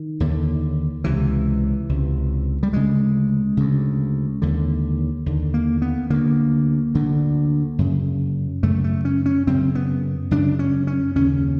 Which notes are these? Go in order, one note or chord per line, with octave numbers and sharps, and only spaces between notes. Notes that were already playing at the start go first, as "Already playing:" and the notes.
Already playing: D#3
D#2 D3
C#2 C3 E3
C#2 C3
G3
D2 C#3 G#3
D2 C#3
D#2 D3
D#2 D3
A#3
B3
D2 D3 A#3
D2 D3
F#2 C#3
F#2 C#3 A3
A3
C#4
C#4
F#2 C#3 C4
B3
F#2 C#3 D4
C#4
C#4
D#2 C#3 C#4